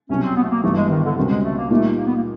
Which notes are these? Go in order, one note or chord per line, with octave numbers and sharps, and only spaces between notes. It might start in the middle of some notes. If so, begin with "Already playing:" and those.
C2 B2 F#3 C#4
C4
B3
A3
A#3
G1 G2 E3 A3
G#3
D#3
D3
C#2 B2 D#3 G3 C4
G#3
A3
A#3
A#2 G3 A3 A#3 D#4
A#3
B3
A#3